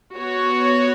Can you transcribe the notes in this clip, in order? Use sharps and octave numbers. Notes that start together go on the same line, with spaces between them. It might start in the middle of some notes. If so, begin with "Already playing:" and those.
B3 F#4 C#5